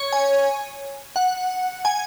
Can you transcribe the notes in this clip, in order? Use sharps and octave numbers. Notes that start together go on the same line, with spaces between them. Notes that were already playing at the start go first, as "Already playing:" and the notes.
Already playing: C#5
G#5
F#5
G#5